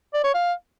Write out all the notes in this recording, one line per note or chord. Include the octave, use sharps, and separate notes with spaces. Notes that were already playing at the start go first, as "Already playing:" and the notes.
D5
C#5
F5